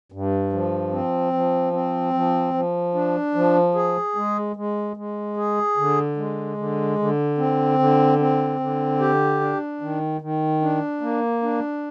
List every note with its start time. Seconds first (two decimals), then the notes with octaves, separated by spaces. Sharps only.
0.12 G2
0.52 F3
0.92 C4
1.33 F3
1.73 C4
2.14 F3
2.54 F3
2.95 D4
3.35 F3
3.75 G#4
4.15 G#3
4.56 G#3
4.97 G#3
5.37 G#4
5.77 D3
6.17 G#3
6.57 D3
6.99 D3
7.38 C4
7.79 D3
8.19 C4
8.60 D3
9.00 G4
9.40 D4
9.81 D#3
10.21 D#3
10.62 D4
11.01 A#3
11.42 D4